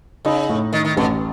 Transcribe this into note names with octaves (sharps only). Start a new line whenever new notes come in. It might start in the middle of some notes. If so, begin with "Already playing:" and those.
C#3 D#4
A2
D#3 D#4
D#3
A1 B2